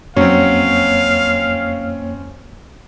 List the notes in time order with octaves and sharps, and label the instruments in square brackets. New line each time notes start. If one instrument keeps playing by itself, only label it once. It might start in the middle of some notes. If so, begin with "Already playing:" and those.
[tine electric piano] F2 A#3 C#5 [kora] F#3 [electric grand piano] C4 C#4 [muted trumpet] F5